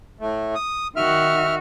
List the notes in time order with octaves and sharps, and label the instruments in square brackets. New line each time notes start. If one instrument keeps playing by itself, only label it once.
[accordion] A2 A3
D#6
[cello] D#3 F#4 [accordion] E5 F6